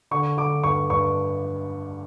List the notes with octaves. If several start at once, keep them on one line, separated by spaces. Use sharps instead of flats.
D3 C#6
D3 D6
G2 C#6
G2 C#6